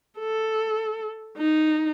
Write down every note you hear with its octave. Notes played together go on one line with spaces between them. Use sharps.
A4
D#4